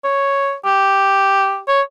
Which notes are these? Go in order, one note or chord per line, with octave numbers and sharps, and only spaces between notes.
C#5
G4
C#5